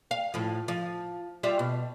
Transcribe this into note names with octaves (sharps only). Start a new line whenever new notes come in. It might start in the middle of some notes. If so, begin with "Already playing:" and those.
F5
A2 F3
F3
G3 F4 E5
B2